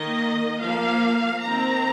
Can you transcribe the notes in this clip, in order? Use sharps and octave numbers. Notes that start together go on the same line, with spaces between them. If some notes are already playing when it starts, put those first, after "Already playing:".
Already playing: D#3 A#3 D#5
F3 A#3 F5
D#3 C4 A#5